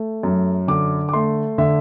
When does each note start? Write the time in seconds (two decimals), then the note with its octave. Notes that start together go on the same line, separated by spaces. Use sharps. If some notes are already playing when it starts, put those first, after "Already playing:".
Already playing: A3
0.23 F#2
0.68 D3 D6
1.09 D6
1.13 A3 C6
1.58 D3 E5